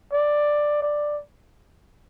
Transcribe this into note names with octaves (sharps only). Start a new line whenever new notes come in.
D5
D5